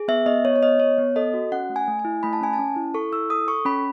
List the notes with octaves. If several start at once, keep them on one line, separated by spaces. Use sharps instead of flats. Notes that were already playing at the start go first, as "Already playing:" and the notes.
Already playing: G#4
B3 E5
B3 D#5
B3 C#5
C#5
B3 D#5
B3 C#5
B3
A4 D#5
F#4
C#4 F#5
A3
G#5
A3
G#5
E4
A3 B5
A5
C#4 G#5
A5
C#4
E4
A4 C#6
E4 E6
A4 D#6
A4 C#6
C#4 B5